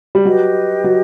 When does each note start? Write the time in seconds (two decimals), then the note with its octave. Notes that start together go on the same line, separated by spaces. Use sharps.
0.15 G3
0.25 F#3 G4 B4 D#5
0.84 F#3